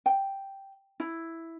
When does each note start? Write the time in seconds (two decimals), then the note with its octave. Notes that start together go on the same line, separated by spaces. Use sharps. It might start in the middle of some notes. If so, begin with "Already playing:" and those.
0.06 G5
1.00 E4